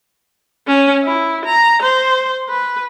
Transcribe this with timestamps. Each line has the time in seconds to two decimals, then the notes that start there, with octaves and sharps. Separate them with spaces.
0.68 C#4
1.04 E4
1.45 A#5
1.82 C5
2.49 B4